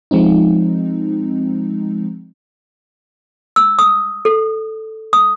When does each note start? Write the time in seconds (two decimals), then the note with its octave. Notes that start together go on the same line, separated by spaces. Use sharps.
0.11 F3 G#3 C4 D#4
3.56 E6
3.79 D#6
4.25 A4
5.13 D#6